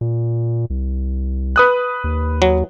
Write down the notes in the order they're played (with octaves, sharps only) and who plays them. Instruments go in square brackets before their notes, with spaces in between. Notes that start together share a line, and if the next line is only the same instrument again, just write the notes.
[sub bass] A#2
C2
[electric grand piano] B4 D#6 F#6
[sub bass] D#2
[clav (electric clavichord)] F#3